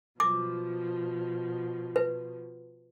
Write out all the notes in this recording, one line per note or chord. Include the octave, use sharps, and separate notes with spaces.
B2 F3 D6
B4